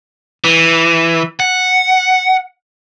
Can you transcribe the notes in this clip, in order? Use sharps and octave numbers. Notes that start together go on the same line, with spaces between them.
E3
F#5